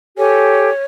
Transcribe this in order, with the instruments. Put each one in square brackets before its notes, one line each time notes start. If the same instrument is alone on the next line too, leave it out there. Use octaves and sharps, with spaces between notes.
[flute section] G4 A4 G#5 [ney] C#5